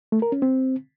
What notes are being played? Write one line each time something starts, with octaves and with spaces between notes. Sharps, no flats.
A3
A#4
C#4
C4